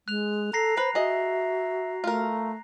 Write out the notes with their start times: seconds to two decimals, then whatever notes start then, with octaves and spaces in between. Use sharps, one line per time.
0.08 G#3 F#6 F7
0.53 A4 A#5 A#6 C7
0.77 B4 C5
0.95 F#4 G#4 D#5 E5
2.04 A3 F4 A#4